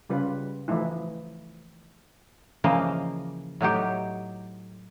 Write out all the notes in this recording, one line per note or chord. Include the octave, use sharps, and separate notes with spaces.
C#3 G3 F4 B4
E3 F3 A3 D#4 E4
C#3 E3 F3 A#3 D#5
A2 F#3 D#4 G4